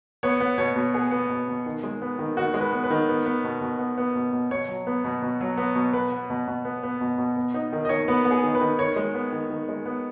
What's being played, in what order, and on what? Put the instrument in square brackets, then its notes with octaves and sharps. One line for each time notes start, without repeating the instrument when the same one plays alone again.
[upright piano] B3 C#5
B3
B2 C#5
B2
B3 G#4
B3
B2
B2
D#3
G#3
B3
D#3
D#3 F#4
G#3
B4
B3
B4
D#3
B3
B3
B2
B2
B3
B3
B2
B2
B2 C#5
F#3
B3
B2
B2
F#3
B3
B2
B3 B4
B3
B2
B2
B3
B3
B2
B2
B3
B3 D#4
D#3
D#5
D#3 C#5
B3 B4
B3
G#4
D#3
B4
D#3
D#3 C#5
G#3
B3
D#3
D#3
G#3
B3